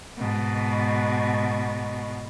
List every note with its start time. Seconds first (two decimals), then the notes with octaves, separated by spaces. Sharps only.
0.17 G#2 B2